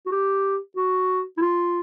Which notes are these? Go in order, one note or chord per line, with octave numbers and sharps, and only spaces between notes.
F#4
G4
F#4
E4
F4